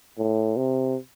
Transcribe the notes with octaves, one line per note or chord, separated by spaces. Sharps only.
A2
C3